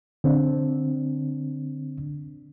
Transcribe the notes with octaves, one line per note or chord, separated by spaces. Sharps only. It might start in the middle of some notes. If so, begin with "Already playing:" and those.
D3 C4 D4